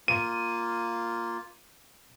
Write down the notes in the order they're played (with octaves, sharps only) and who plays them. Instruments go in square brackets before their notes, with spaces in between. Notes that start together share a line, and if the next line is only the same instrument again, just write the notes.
[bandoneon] A#3 F4 [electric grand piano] D#7